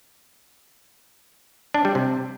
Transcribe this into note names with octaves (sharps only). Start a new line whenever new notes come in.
D4
G3
C3